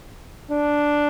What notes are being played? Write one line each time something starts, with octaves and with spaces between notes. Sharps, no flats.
D4